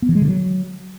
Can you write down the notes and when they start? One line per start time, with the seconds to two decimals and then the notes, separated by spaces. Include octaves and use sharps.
0.02 B3
0.09 E3
0.15 G#3
0.22 D3
0.28 F#3